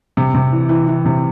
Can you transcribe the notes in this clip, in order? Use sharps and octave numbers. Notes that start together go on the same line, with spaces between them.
C3
C3
E3
E3
E3
C3